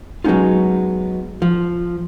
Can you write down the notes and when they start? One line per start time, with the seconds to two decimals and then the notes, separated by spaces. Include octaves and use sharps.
0.24 F#3 G#3 B3 C#4 D#4 F4
1.42 F3